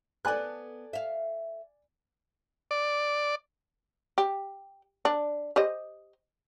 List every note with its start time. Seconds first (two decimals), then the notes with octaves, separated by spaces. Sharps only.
0.25 B3 A4 D5 G#5 F#6
0.93 E5 F5
2.71 D5
4.18 G4
5.05 D4
5.56 G4 C5 D#5